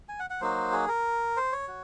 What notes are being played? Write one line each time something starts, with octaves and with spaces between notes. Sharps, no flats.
G#5
F#5
F#5
F#3 A#3 D#4 F#4 C5
G#4
A#4
C5
C#5
F#4